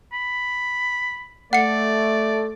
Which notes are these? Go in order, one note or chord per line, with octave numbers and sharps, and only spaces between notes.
B5
A3 D5 F#5 C#7